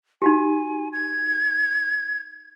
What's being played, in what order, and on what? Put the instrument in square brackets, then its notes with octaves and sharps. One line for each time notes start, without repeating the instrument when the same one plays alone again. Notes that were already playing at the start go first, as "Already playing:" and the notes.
[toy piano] D#4 F#4 G4 [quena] G#5
[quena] G#6